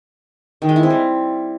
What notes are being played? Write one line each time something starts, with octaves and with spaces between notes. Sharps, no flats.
D#3
G#3
E4
C4
G3